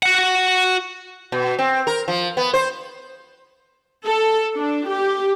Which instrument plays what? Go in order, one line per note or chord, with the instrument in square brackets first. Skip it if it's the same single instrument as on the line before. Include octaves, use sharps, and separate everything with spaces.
[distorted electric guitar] F#4 F#5
[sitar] B2
C4
A#4
F3
B3
C5
[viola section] A4
D4
G4